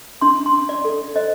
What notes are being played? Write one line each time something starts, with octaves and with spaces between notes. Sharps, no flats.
D4 C6
C6
D4
D5
A4
C5 D#5